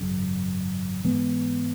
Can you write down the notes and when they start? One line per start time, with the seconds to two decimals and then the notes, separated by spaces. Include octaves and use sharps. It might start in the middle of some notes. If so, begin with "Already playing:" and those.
Already playing: G#1 F#2 C#3
1.04 G#2 E3 G#3 B3